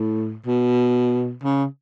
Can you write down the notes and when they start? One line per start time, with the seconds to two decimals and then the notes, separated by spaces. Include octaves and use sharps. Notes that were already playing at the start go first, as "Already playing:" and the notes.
Already playing: A2
0.46 B2
1.44 C#3